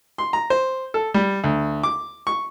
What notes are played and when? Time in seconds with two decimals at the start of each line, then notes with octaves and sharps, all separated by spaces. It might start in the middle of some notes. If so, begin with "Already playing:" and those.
0.18 C6
0.33 A#5
0.50 C5
0.94 A4
1.14 G3
1.44 D2
1.83 D6
2.27 C#6